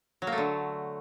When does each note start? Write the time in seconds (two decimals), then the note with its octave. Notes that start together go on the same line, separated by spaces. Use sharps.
0.22 F#3
0.27 A#3
0.32 A3
0.38 D3